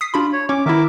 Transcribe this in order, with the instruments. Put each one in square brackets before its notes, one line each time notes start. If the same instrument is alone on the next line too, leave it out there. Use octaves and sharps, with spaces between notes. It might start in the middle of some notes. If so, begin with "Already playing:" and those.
[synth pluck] D#6 B6 C7
[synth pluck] D4 F#4 B5 [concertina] F4
[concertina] C#5
[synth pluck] C#4 C#5 [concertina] D6
[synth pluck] D#3 B3 E4 [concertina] A#4 E5 D6